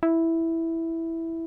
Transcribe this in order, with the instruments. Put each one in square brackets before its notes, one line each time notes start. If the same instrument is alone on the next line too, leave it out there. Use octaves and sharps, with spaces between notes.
[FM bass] E4